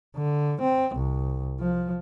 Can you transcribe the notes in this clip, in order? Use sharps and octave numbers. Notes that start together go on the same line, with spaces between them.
D3
C4
C2
F3